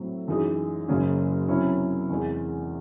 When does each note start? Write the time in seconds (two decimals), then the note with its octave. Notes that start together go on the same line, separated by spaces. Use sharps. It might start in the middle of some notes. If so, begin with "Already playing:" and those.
Already playing: A2 F#3 C4
0.28 F#2 E3 G#3 D#4 G#4
0.88 F#1 F#2 C#3 F#3 C#4
1.48 C3 F#3 C#4 E4
2.09 E2 C3 E3 G#3